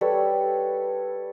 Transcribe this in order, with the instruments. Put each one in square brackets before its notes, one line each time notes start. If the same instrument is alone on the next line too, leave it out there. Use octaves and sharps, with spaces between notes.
[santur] G3 A4 B4 C#5